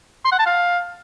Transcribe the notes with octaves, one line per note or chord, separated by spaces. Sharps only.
C6
F#5
A5
F5